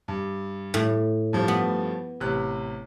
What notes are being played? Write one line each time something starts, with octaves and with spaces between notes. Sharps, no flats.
G2
A2
G2 F3 A3
B3
A1 C3 F#6